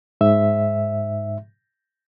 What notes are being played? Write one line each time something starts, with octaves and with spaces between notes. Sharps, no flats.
G#2 E5